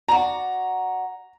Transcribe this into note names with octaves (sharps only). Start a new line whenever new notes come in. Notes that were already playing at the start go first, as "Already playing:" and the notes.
F#4 D5 A#5